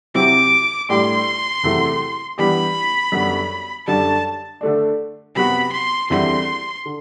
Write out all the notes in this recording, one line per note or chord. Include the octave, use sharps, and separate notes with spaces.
C3 F#3 C4 E4 G4 D6
A2 G3 D4 G4 C6
E2 C3 F#3 A3 E4
E3 G3 B3 D4 G4 B5
F#2 D3 G3 B3 F#4
F#2 D3 G3 D4 A5
D3 A3 D4
C3 F#3 B3 F#4 B5
C6
E2 D3 G3 C4 E4 C6
D3